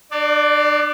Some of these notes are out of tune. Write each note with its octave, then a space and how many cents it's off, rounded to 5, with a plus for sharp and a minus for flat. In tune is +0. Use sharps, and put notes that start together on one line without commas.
D4 +35 D5 -5